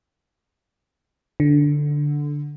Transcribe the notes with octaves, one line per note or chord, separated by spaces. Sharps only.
D3